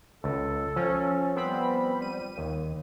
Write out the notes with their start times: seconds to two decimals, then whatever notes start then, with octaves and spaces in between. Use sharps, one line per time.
0.24 C#2 A4
0.76 F3 C#4
1.36 G3 B3 C4 B5
2.02 D#7
2.38 D#2 D#3